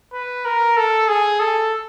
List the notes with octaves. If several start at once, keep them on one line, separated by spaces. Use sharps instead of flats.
B4
A#4
A4
G#4
A4